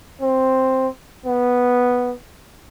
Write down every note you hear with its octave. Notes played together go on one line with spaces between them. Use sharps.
C4
B3